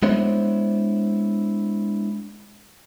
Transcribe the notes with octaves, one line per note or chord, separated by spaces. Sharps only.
G#3 B3 D4 E4 C5 C#5